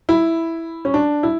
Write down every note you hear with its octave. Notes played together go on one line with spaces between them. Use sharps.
E4
C#4
D4
E4